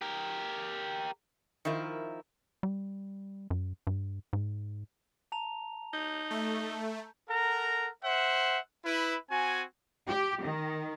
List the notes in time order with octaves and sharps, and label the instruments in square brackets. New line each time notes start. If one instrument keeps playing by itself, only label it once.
[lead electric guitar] G4 A#4
[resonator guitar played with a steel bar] D#3 F3 E4 A#4
[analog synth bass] G3
F#2
G2
G#2
[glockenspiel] A5 A#5 F7
[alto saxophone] D#4 [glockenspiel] G6
[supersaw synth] A3
[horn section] A4 A#4 F#5 A#5
C5 E5 F#5
E4 B4
C4 F#4 G#5
[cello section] G4
D#3